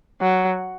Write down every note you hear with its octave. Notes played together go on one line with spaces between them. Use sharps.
F#3